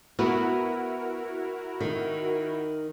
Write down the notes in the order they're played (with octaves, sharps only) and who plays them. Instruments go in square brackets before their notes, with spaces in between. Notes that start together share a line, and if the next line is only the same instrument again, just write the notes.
[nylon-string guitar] B3 [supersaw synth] E4 F#4 A#4
[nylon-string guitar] D#3